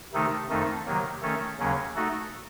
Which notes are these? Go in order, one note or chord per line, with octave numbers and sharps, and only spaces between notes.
C3 D#3 A3 D#4 A4
F2 D#3 A3 D#4 A4
C3 D#3 F#3 A#3
D#3 A3 C#4 A4
D#2 C#3 F#3 A#3 C#4
A3 D#4 F#4 A4